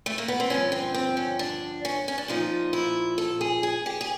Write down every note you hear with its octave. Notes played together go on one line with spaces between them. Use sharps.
A3
A#3
B3
C4
G2 D3 F3 C#4
C4
C4
C#4
D4
C#4
C#4
D4
A#2 F3 D#4
E4
A4
G#4
G#4
G4
G#4